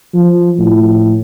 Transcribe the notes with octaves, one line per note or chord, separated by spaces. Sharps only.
F3
A2